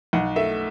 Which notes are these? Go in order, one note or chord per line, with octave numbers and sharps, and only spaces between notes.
B1 F#5
A3 E5